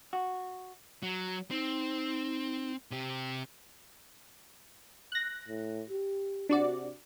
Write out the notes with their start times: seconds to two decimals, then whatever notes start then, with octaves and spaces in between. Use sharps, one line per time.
0.13 F#4
1.03 F#3
1.51 C4 D#4
2.91 C3 G4
5.12 F#6 A#6
5.48 A2
5.90 G4
6.49 C3 D4 F#4 D5